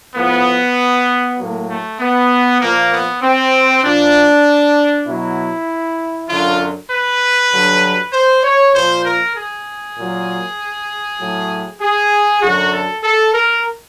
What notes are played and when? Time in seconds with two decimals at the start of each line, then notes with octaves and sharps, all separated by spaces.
0.16 A2 F3 B3
1.39 A2 F#3 A#3
1.69 A3
2.00 B3
2.61 A#2 F3 A#3
2.92 B3
3.23 C4
3.84 A#2 F3 D4
5.07 B2 F#3 E4
6.29 F#2 D3 F#3 F4
6.90 B4
7.52 G2 D3 F#3
8.13 C5
8.44 C#5
8.74 A#2 F3 C5
9.05 A#4
9.35 G#4
9.97 A#2 F#3
11.20 A2 F#3
11.81 G#4
12.42 F#2 D3 F#3 F#4
12.73 A4
13.04 A4
13.34 A#4